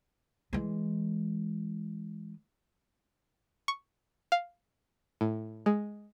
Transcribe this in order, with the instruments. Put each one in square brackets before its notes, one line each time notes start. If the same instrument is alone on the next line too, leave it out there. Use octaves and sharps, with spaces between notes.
[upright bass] E3 G#3
[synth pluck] C#6
F5
A2
G#3